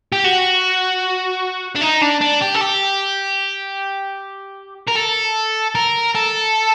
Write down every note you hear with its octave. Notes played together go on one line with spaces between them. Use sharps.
G4
F#4
D4
D#4
D4
D4
G4
A4
G4
A#4
A4
A#4
A4